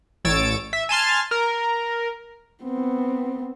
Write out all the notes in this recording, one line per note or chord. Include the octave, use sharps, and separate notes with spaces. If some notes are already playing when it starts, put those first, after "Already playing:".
A1 C#5 E6 A6 D7
E5
G#5 A5 C6 F6
A#4
B3 C4